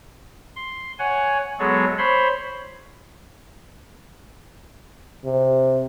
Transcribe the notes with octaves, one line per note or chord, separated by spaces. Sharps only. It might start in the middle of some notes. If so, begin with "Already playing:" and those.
C6
C#5 F#5 G#5
F#3 G#3 B3 G#4 A4 C#5
C5 C#5 B5 C6
C3